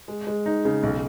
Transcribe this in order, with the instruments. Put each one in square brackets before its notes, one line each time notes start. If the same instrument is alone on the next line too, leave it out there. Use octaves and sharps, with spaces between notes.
[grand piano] G#3
G#3
D#4
C#3
B1